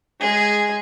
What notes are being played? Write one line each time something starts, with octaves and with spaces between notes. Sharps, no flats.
G#3 G#4